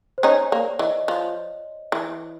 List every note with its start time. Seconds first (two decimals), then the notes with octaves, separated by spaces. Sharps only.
0.18 C5
0.23 C#4 D#4 C#5
0.51 A#3 D5
0.79 E3 D#5
1.08 F3
1.92 E3